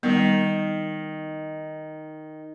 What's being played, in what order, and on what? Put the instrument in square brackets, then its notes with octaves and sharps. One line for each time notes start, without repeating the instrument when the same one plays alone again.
[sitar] D#3 [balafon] G3 B3